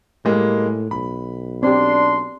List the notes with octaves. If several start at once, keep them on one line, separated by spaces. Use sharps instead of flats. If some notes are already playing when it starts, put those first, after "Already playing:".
A2 G3 G#3 A#3
B1 B5
C4 D4 G4 C6